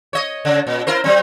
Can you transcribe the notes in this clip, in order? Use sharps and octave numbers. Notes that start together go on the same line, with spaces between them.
C#5 D#5
C#3
A#2
E4 A#4 C5
F#3 C4